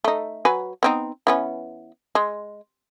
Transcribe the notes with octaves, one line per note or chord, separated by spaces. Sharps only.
A3 D#4
F#3 B4 G#5
B3 C4 D#4
E3 B3 C#4
G#3